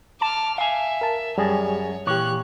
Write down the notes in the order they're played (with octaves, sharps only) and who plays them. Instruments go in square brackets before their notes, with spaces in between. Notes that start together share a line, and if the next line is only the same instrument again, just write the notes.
[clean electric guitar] A5 [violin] D6 F6
[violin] E5 [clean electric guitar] F5 G#5
[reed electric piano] A#4 A5
[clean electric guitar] F#2 [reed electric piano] G3 G#4 [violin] C#5
[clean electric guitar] A#2 C#5 [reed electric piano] E3 G4 [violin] F#6